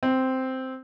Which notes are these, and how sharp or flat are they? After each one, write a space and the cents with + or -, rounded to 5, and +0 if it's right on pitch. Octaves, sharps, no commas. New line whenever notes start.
C4 -5